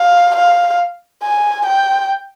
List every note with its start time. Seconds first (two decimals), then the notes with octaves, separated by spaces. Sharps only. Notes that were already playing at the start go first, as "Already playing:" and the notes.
Already playing: F5
0.36 F5
1.23 G#5
1.66 G5